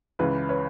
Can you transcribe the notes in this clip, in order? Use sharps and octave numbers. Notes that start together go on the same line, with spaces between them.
C#2 C#3 E3 B4
B4 C#5